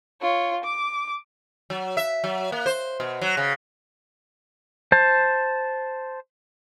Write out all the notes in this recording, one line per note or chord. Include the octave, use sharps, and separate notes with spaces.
F4 C#5
D6
F#3
E5
F#3
A#3
C5
B2
F#3
C#3
C5 A5